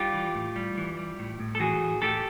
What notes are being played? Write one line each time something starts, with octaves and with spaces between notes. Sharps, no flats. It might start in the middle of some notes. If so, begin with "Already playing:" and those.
Already playing: G3 F4 G4
E3
A2
G3
E3
G3
A2
A2
A4
E3 F#4 G#4
A2
A2 G4 A4